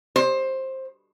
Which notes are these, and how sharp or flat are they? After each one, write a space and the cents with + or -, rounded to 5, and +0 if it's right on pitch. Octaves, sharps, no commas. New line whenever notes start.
C5 +15